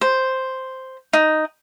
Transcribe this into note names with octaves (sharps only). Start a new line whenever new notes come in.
C5
D#4